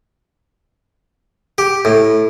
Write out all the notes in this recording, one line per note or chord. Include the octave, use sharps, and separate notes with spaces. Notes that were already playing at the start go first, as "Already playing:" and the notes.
G4
A2